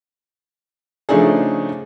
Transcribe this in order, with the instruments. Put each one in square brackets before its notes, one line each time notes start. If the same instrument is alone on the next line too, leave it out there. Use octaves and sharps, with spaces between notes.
[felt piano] C#3 F3 A3 D4 D#4 G#4